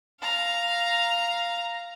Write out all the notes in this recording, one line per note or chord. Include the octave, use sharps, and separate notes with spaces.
F5 A#5